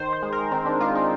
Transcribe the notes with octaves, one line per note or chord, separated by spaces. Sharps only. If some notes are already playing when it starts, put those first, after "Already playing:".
Already playing: D#3 C5
C5
G#3
A#4
D#3 C4
D4
G#3 F4
D#4